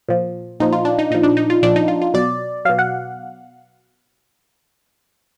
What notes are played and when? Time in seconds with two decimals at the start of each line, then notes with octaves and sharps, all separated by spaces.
0.08 A#2 F3
0.60 A#2 F3 D#4
0.72 F4
0.85 D4
0.99 D#4
1.11 A#2 F3 D#4
1.23 D4
1.37 D#4
1.50 F4
1.62 A#2 F3 D4
1.76 D#4
1.88 F4
2.02 F4
2.14 B2 F#3 D5
2.65 B2 F#3 F5
2.79 F#5